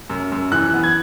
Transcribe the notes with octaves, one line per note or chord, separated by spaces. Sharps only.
F#2
F#2
E3 F#6
B3
G#6